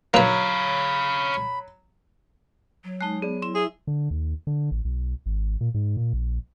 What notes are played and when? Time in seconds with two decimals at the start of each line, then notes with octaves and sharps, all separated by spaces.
0.14 F#3 A#3 B4 C#5 F5 B5
2.84 F#3
3.01 G#3 D#4 A5 F#6
3.22 B3 G#4 D5
3.42 E4 C6 E7
3.55 E4 G#4 E5
3.87 D3
4.11 D#2
4.47 D3
4.71 A1
4.85 B1
5.26 G#1
5.61 A#2
5.74 G#2
5.97 A#2
6.13 A#1